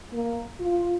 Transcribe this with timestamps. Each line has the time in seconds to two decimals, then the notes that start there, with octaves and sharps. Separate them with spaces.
0.12 A#3
0.60 F4